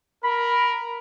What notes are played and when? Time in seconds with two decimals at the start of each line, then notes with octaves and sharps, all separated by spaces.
0.24 A#4 B5